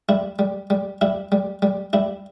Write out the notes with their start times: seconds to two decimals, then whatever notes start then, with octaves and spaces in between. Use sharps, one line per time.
0.09 G3 E4
0.39 G3
0.70 G3
1.01 G3 E4
1.32 G3
1.62 G3
1.93 G3 E4